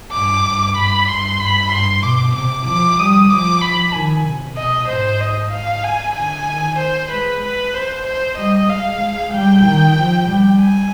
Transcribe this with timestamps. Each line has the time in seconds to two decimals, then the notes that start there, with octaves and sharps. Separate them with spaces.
0.12 G2 D6
0.45 G2
0.76 G2 B5
1.08 G2 C6
1.39 G2 B5
1.71 G2 C6
2.02 B2 D6
2.35 C3 D6
2.67 F3 D6
2.98 G3 D#6
3.30 F3 D6
3.62 B5
3.93 D#3 G#5
4.25 C3
4.56 B2 D#5
4.88 G#2 C5
5.21 D#5
5.52 F5
5.84 G#5
6.16 D3 G#5
6.47 D#3
6.79 C5
7.11 G#3 B4
7.43 B4
7.75 C5
8.07 C5
8.38 G3 D#5
8.70 G#3 F5
9.01 G#3
9.33 G3 G5
9.65 D#3
9.97 F3
10.29 G3
10.60 G#5